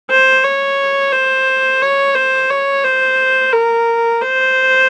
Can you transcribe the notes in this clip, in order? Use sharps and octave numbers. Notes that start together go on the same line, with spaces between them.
C5
C#5
C5
C#5
C5
C#5
C5
A#4
C5